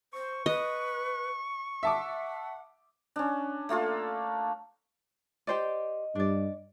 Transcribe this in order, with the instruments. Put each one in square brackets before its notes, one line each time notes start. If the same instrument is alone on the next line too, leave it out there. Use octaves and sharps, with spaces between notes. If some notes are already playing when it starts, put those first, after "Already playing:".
[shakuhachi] C5 [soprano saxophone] C#6
[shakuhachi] B4 [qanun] D#5
[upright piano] E5 A5 D6 [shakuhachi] F#5
[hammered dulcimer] C#4 D4
A3 A#3 F4 A4
[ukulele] G4 C5 D5 [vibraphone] D#5
[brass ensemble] G2 [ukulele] D4 D5